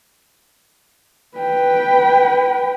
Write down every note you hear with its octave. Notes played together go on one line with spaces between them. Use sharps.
B4 G5